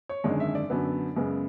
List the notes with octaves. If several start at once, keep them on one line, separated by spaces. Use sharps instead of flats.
C#5
G#1 F#2 D3 G#3 D5
E5
D5
F#2 D3 F#3 B3
F#2 C#3 G#3 B3